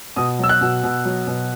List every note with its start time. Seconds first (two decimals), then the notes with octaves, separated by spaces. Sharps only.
0.16 B2 D#6
0.39 F#3 E6
0.49 F#6
0.61 B2
0.83 B2
1.05 F#3
1.27 B2